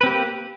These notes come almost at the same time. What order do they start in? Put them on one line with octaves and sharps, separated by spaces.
B4 C4 G4 A#3